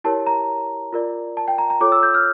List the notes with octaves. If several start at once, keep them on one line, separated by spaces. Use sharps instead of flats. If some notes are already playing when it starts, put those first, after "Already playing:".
E4 G4 A#4 C#5 A5
A#5
F4 A#4 D5
A5
G5
A#5
A#5
F4 A4 C#5 D6
E6
G6
F6